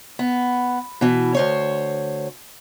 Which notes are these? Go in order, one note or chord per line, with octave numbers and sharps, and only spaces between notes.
B3
B2 E3
D2 C5 C#5